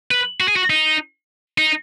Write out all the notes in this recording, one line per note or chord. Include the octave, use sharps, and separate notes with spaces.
B4
F#4
G#4
F#4
D#4
D#4